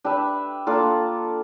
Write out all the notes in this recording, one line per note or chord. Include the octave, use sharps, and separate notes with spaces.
D4 G4 B4 E5
A#3 D4 F4 A4